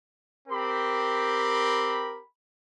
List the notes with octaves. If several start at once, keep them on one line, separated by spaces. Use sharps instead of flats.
C4 G4 A#4 B5